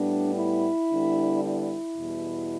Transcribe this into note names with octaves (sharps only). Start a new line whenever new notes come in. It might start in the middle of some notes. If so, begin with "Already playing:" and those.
Already playing: A2 G3 B3 D4
E4
D3 G3 B3 D4
E4
E2 B2 G3